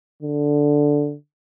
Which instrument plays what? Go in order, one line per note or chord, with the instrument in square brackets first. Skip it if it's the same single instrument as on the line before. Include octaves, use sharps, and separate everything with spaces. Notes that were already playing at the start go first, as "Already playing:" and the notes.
[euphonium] D3